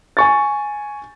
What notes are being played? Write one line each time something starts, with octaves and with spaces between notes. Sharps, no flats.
G#5 C#6 A6